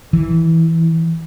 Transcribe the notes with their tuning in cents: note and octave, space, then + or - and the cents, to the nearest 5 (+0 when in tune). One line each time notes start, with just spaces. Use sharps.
E3 -10